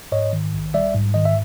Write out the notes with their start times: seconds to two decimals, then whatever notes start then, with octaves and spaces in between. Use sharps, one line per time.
0.12 G#2 C#5 D#5
0.33 D#3
0.54 A#1
0.74 G3 D5 E5
0.95 G#2
1.14 D#3 D#5
1.25 E5